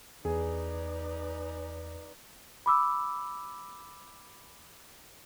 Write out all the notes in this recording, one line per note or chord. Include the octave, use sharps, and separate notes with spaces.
E2 D#4 G#4 B4 D5
B5 D6 E6